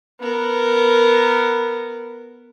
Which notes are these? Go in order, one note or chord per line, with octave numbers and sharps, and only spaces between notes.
B3 A#4